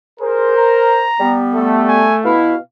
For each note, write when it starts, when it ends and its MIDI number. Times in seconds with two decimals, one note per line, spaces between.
0.20 0.53 68
0.20 1.06 70
0.20 1.06 72
0.57 1.39 82
1.20 2.10 55
1.20 2.10 59
1.54 2.30 57
1.54 1.81 69
1.88 2.19 80
2.24 2.55 47
2.24 2.55 64
2.24 2.61 77